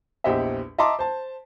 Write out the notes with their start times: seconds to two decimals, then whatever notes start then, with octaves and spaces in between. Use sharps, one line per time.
0.24 A#1 E2 G4 C5 D#5 E5
0.78 D#5 E5 A5 A#5 C6 D6
0.99 C5 A5